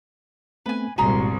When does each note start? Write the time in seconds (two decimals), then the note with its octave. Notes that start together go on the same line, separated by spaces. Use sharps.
0.66 A3 B3 C4 B4 G#5
0.98 G1 C2 A#2 G#3 F#4 G#4 A#5 C6